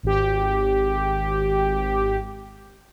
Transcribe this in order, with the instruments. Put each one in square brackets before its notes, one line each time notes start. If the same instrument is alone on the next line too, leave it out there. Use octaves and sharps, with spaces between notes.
[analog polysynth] G#1 G4